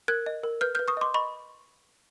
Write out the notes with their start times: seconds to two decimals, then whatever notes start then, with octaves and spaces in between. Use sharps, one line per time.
0.08 A#4 F#6 G#6
0.26 D#5
0.44 A#4
0.61 B4 F6 G6
0.75 B4 F6 G6
0.88 C#6 D#6
0.97 D#5 C6 D6
1.14 D#5 B5 C#6